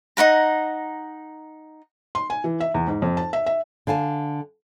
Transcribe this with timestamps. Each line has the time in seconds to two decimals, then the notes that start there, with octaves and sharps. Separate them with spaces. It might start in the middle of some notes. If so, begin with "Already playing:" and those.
0.17 D#4 E4 F#5 A#5
2.15 C6
2.30 G#5
2.44 E3
2.60 E5
2.74 E2
2.88 G#2
3.02 F2
3.17 A5
3.33 E5
3.46 E5
3.87 D3 F5 G#5 A5